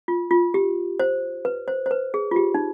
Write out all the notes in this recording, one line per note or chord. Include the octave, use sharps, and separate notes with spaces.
F4
F4
G4
C5
B4
C5
C5
B4
G#4
F4
G4
D#4